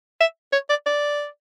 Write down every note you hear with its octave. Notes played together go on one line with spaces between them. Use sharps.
E5
C#5
D5
D5